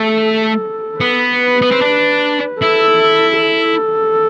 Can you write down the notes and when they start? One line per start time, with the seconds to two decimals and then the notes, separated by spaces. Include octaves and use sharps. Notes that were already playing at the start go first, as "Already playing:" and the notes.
Already playing: A3 A4
1.00 B3 B4
1.62 B3
1.71 C4
1.82 D4
2.61 E4 A4
3.42 A4